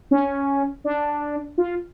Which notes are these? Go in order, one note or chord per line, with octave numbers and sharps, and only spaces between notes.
C#4
D4
F4